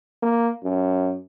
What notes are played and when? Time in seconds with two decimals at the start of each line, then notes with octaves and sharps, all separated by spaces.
0.22 A#3
0.63 F#2